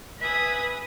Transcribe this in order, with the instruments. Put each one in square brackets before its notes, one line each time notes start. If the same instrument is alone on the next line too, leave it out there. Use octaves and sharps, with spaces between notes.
[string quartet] B4 E5 G#5 B5 D#6